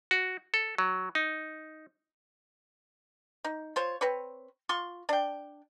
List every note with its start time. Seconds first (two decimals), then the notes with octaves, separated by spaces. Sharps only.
0.11 F#4
0.54 A4
0.78 F#3
1.15 D#4
3.44 D#4
3.76 F4 C5 C#5
4.01 C4 B4 C#5
4.69 F4 C6 C#6
5.09 D4 G5